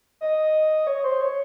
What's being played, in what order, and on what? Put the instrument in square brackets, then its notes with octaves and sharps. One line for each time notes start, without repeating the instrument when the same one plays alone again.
[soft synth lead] D#5
C#5
C5
C#5